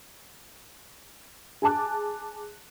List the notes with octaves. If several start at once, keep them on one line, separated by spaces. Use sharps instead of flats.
G#4 G#5 A5 D6 F#6